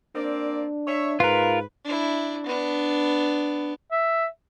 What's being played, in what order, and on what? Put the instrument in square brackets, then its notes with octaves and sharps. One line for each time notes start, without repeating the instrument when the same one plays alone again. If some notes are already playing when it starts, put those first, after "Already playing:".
[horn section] A#3 C4 D5 [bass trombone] D4
[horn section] C#5 E5
[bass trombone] G#2 [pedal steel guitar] F4 A#4 [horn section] B4
[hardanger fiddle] D4 E4
B3 D4
[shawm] E5